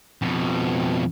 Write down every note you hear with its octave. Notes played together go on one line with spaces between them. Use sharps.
F2 B2